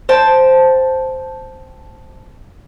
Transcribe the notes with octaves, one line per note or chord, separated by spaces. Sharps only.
C5 G5 A5